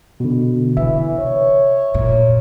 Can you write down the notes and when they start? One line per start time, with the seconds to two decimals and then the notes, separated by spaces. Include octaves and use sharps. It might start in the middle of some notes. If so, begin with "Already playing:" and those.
0.20 B2 D3
0.77 C3 E3 E5
1.19 C#5
1.94 F2 A#2